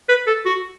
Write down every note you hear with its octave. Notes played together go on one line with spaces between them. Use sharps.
B4
A4
F#4